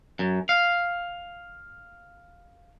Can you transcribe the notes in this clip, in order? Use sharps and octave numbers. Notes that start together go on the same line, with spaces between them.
F#2
F5